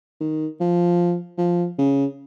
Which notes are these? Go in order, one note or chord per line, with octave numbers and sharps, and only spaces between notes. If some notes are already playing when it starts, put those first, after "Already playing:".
D#3
F3
F3
C#3